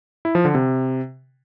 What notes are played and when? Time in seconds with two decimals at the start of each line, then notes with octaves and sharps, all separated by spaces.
0.25 E4
0.35 F3
0.45 D3
0.55 C3